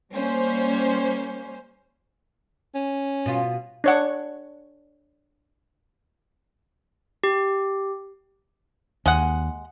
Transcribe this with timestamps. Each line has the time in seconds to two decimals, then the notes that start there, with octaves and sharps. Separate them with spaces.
0.13 G3 A#3 C#4 C5
2.75 C#4
3.26 B2 F4
3.84 D4 C#5 F#5
7.24 G4
9.06 D#2 G#3 F#5